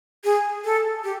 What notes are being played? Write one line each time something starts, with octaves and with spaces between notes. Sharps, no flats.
G#4
A4
G4